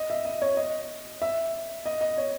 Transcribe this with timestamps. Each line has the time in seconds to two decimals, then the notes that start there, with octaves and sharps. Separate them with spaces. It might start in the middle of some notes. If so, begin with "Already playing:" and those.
Already playing: D#5
0.10 E5
0.25 D#5
0.42 C#5
0.57 D#5
1.22 E5
1.86 D#5
2.01 D#5
2.18 C#5